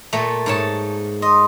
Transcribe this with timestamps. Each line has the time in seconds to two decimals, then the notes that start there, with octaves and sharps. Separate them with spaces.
0.13 A#2 A3
0.46 G#2 C#5 A5
1.22 D#5 C6